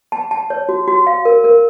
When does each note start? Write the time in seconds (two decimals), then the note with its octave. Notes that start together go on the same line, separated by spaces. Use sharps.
0.12 A5
0.31 A5
0.50 C#5
0.69 F#4
0.88 F#4
1.07 F5
1.25 A#4
1.44 A#4